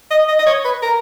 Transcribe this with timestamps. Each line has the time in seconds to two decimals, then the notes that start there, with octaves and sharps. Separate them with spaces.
0.11 D#5
0.28 D#5
0.39 D#5
0.46 C#5
0.64 B4
0.82 A#4